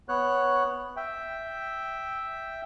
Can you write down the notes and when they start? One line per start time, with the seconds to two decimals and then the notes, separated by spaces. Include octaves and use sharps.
0.09 B3 C#5 F#6
0.97 E5 G5